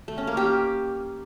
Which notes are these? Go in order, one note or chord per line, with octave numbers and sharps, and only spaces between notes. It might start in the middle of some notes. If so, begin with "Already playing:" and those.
A3
C#4
A#3
G4